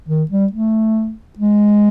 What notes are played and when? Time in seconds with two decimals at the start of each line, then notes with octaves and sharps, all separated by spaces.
0.09 D#3
0.31 G3
0.53 A3
1.39 G#3